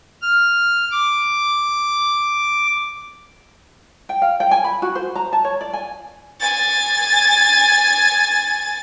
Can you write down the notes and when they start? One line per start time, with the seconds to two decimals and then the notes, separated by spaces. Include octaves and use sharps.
0.22 F6
0.92 D6
4.09 G5
4.22 F5
4.40 G5
4.51 G#5
4.64 B5
4.82 F#4
4.95 C5
5.15 A#5
5.33 A5
5.45 C#5
5.61 D5
5.73 G#5
6.40 G#5 A6